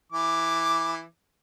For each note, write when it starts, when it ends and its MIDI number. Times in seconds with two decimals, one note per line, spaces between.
0.12 1.03 52
0.12 1.03 86